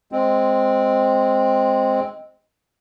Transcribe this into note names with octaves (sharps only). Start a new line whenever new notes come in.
G#3 C4